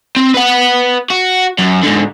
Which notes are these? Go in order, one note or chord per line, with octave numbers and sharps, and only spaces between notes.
C4
B4 F#5
F#4
F#2
G#2 D3